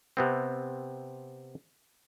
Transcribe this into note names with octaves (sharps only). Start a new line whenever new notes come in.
C3 B3 C4